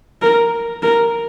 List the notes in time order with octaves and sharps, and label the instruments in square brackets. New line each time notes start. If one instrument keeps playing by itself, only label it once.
[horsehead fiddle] A#4
A#4